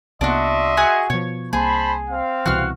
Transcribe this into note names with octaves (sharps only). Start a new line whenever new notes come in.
C2 A#3 B3 D4 F#4 D#5 E5 C6
F#4 G#4 G#5
B2 F3 C#5
C2 A#3 G#4 C5 A5 B5
C4 F5
C2 B2 E3 F#4 F6